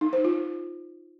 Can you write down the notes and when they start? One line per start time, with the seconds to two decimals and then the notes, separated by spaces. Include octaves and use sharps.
0.01 D#4
0.13 C5
0.25 F4